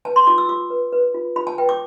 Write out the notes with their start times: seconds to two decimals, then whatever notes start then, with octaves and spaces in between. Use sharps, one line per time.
0.05 B4 A5
0.16 C6
0.27 F4 D6
0.38 E6
0.49 F4 D6
0.70 B4
0.92 B4
1.14 F4
1.36 F4 B5
1.47 A5
1.58 B4 G5
1.69 D6